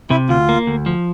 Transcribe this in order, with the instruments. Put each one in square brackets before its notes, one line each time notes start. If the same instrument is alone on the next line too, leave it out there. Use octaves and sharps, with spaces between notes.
[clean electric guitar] C3 [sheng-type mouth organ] E4
[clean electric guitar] D2 [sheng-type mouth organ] F4
[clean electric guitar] A#3
D2
F3